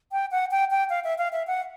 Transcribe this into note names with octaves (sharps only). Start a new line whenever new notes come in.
G5
F#5
G5
G5
F5
E5
F5
E5
F#5